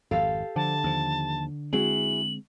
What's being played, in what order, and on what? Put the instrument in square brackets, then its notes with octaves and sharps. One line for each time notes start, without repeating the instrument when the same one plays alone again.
[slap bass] G#1 F2 [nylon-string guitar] G4 A4 F5
[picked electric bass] D3 [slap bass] F3 [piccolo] A5
[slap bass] D#2 F3
[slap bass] G#3 C4 [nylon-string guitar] E4 F#4 G#4 [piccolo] F#7